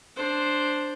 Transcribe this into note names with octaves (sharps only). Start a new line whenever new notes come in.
D4 C5